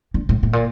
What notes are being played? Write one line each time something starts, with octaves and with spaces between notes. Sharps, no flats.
D3
A2
A2
A#2